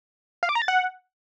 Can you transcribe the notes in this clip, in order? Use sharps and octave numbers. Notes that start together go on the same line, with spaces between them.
F5
D6
A#5
A6
F#5